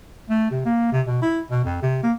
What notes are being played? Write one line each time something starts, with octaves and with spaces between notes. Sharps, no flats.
A3
C3
A#3
C3
B2
E4
B2
F2
C3
A#3